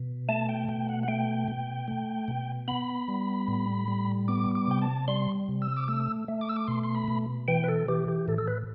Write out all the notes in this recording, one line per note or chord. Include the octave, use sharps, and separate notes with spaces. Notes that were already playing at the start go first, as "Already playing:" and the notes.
Already playing: B2
A3 A5
G5
B2 G5
F#5
F#5
A3 G5
B2
A3
B2
B3 B5
G3
A2
G3
B3 D6
D6
C3 G5
A5
G3 C6
C3
E6
D6
A3 E6
A3
D6
E6
D6
B2 C6
C6
B5
B2
E3 G5
B4
A4
E3 G4
G4
A2 A4
A4
B4